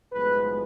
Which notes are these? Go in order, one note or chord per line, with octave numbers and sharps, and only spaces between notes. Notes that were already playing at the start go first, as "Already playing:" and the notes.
B1 A2 F3 G#3 B3 B4